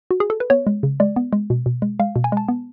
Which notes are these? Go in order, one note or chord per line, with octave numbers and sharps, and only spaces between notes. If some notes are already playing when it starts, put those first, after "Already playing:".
F#4
G#4
A4
B4
B3 C#5
G#3
C#3
G#3 D5
B3
G#3
B2
B2
G#3
G#3 F5
B2
G#5
G#3 A5
B3